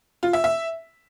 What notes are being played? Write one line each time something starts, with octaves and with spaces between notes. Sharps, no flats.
F4
E5
E5